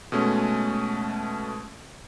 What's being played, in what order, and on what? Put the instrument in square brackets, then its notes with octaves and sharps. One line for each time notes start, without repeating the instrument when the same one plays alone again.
[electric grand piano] B2 G#3 A3 C#4